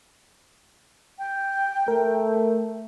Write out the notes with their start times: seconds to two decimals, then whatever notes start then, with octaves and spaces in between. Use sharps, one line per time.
1.19 G5
1.88 A3 A#4